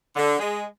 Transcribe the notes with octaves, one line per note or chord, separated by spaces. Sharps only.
D3
G#3